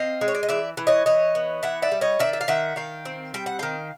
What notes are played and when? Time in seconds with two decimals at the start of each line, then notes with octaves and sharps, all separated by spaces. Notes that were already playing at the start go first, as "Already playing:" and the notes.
Already playing: C4 D#5 F5
0.21 G#3
0.28 C#5
0.35 D5
0.43 D#5
0.49 E3 D5 E5
0.77 E3
0.87 C#5 D#5
1.06 E3 C#5 D#5
1.35 B3
1.63 E3 E5 F#5
1.82 D5 E5
1.92 G3
2.01 C#5 D#5
2.19 D#3 D5 E5
2.33 E5
2.41 F5
2.48 D#3 E5 F#5
2.76 D#3 F5 G5
3.05 C4
3.34 G3 G5
3.46 F#5
3.59 D#3 F5 G5